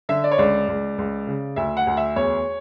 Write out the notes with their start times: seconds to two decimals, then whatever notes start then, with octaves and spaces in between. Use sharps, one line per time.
0.09 D3 E5
0.24 D5
0.31 C#5
0.38 C#2 D5
0.68 C#2
0.98 C#2
1.27 C#3
1.56 D2 E5
1.77 F#5
1.87 D2
1.97 E5
2.16 E2 C#5